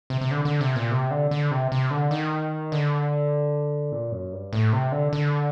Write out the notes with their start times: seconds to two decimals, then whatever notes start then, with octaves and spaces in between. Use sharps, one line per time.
0.10 C3
0.21 C3
0.31 D3
0.45 D3
0.61 C3
0.76 A#2
0.91 C3
1.11 D3
1.31 D3
1.51 C3
1.72 C3
1.91 D3
2.11 D#3
2.72 D3
3.92 A#2
4.12 F#2
4.33 G2
4.53 A2
4.73 C3
4.92 D3
5.13 D3